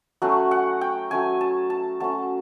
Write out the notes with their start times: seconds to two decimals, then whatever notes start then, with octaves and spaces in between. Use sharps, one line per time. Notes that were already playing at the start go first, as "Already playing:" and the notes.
0.22 F#3 A3 C#4 F#5
0.51 F#5
0.81 G5
1.11 F#3 A3 C#4 G#5
1.41 A5
1.70 A5
2.00 F#3 A3 C#4 A5